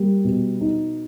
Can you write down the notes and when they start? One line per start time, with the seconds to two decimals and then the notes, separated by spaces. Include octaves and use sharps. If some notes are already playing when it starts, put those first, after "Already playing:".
Already playing: G3 A#3
0.24 B2
0.61 D#4